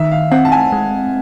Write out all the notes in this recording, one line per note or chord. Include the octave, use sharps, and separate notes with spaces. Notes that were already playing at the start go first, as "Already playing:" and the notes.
Already playing: D#3 E5
F5
C4 F#5
A5
G#5
G#3